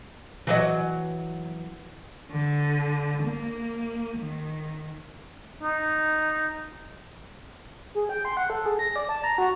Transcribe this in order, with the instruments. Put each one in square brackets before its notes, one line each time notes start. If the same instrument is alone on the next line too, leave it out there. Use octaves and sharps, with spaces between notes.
[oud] E3 F#3 D#5
[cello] D3
A#3
D#3
[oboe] D#4
[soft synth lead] G#4
G5
C6
F#5
A4
G#4
A#6
D5
A5
A#5
F#4